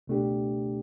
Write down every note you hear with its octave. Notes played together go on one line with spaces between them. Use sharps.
C#2 B2 A3 D4 G4